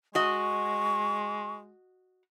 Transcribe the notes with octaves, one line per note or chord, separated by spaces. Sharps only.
G#3 F#4 D#5 C#6